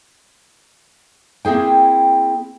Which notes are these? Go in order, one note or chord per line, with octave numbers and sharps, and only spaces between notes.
A#3 C4 E4 G#4 G5